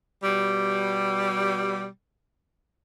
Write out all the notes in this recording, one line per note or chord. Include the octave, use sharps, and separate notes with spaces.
B2 G3